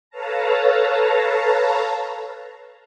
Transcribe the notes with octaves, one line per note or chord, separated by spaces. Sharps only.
A4 B4 C#5 F5 A5 A#5